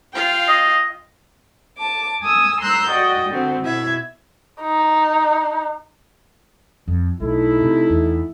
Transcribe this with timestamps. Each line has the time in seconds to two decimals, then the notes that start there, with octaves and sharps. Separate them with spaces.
0.14 F4 F5 G5
0.48 D#5
1.79 A5 D6
2.23 G#5 D#6 E6
2.61 A#5 C6 E6 F#6 G6
2.90 F#4 D5 D#5 G5
3.30 D3 B3 C4 F#4
3.62 B2 E4 E5 G#6
4.62 D#4
6.88 F2
7.20 B1 A3 D#4 E4
7.61 C3
7.90 E2